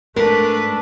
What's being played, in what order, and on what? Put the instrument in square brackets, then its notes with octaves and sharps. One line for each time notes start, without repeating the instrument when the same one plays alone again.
[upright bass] G#2 [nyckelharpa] A3 D4 [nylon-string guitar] A#4 [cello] B4